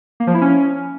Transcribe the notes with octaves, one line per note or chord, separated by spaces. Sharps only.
A#3
F3
E4
C#4